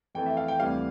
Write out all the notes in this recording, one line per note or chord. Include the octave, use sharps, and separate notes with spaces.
F2 E3 A3 G5
E5
F5
G5
D2 C3 E3 G3 F5